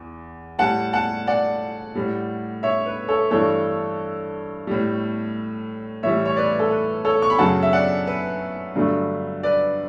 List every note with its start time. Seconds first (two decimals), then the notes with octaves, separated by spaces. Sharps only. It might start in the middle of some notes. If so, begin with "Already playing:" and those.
Already playing: E2 E3
0.59 A2 G3 F#5 A5
0.93 F#5 A5
1.27 D5 F#5
1.95 A2 G3
2.63 C#5 E5
2.86 B4
3.08 A4 C#5
3.31 G2 E3 A3 A4 C#5
4.67 A2 G3
6.03 A2 E3 G3 C#5 E5
6.25 C#5
6.37 B4 D5
6.59 A4
6.71 B4
7.05 A4 C#5
7.22 C#6
7.30 B5
7.38 F#2 C#3 F#3 A3 F#5 A5
7.62 E5
7.73 D5 F#5
8.07 B4
8.76 G2 D3 F#3 A3
9.43 B4 D5